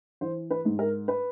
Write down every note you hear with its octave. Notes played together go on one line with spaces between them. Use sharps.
E3 C5
B4
G#2
A#4
B4